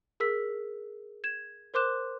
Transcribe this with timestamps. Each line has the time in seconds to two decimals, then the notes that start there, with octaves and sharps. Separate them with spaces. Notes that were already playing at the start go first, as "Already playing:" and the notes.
0.20 G#4 A#4 E6 B6
1.24 G#6 E7
1.74 A#4 C5 C6 D6 F#6 E7